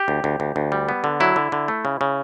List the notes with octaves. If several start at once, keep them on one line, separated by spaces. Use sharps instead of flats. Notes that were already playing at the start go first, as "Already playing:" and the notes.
Already playing: G4
D2
D2
D2
D2
G3
B3
D3
F#3 E4
D3
D3
A3
C#3
C#3